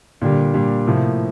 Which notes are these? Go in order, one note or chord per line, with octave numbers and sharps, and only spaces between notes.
A#2 D3 G3 D4 G4
A#2 G3 D4 G4
A2 C3 F3 A#3